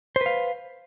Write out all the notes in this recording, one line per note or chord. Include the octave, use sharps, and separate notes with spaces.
B4 C5 F5